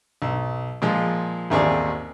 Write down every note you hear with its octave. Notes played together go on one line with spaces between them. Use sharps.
B1
A#2 F3 G#3
A1 D#2 C4 G#4 D5